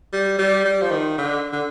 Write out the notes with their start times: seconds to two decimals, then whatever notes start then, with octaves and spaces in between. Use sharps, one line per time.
0.13 G3
0.38 G3
0.65 G3
0.82 F3
0.91 D#3
1.18 D3
1.52 D3